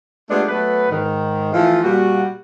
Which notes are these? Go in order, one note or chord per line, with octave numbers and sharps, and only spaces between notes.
G#3 A3 B3 D4 F4 G4
F#3 A3 B3 B4
G#2 D#3
E3 F3 A3 F4
A#2 G3 A#3 F#4